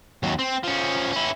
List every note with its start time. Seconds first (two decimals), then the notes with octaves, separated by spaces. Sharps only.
0.23 D#2 F#3
0.39 C4
0.63 F3 C#4
1.12 C#4 E4